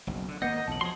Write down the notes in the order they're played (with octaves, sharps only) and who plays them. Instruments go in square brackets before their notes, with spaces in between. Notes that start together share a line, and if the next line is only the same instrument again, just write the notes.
[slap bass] F#1 B1
D3
[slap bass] G#1 A#3 B3 [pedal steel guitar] D#5 [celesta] F#5 G6 C#7
[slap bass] B1 E2 C#3 [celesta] A5 F#7
[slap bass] F3 F#3 [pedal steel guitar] G#4 C6